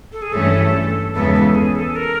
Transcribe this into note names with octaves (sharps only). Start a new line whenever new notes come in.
A4
G#4
G2 E3 A3 C#4 A4
E2 C#3 E3 G#3 B3 A4
A4
G#4
A4
A#4